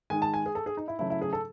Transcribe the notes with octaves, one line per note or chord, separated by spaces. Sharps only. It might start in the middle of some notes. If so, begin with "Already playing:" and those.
D#3 G#3 G#5
A5
G#5
G#4
A4
G#4
D#4
E4
C#3 F#3 A3 E4
E4
G#4
A4